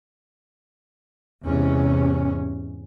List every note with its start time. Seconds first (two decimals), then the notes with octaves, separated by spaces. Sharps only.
1.44 E2 G#2 C3 C#4